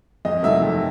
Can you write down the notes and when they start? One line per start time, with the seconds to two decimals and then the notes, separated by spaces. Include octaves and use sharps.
0.25 F2 D#5
0.43 C3 D#3 F#3 A3 E5
0.62 F2